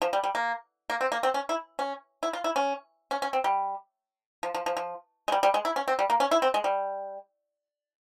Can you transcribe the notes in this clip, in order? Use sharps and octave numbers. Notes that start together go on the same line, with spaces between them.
F3
G3
G3
A#3
A#3
C4
A#3
C4
C#4
E4
C#4
E4
F4
E4
C#4
C#4
C#4
C4
G3
F3
F3
F3
F3
G#3
G3
G3
G#3
E4
C#4
C4
G3
A#3
C#4
E4
C4
G#3
G3